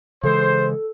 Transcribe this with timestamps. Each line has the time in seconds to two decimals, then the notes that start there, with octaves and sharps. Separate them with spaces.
0.23 C#3 E3 G#3 A4 C5